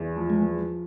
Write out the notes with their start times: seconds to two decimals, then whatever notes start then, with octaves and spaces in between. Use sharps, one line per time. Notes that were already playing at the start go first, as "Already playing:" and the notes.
Already playing: E2
0.16 F3
0.30 G#3